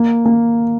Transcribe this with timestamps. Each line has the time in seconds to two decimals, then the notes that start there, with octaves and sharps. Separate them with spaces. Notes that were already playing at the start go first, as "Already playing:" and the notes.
Already playing: A#3
0.26 A#3